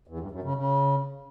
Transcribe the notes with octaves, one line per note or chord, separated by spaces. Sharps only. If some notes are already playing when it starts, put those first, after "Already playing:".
E2
G2
F#2
C#3
C#3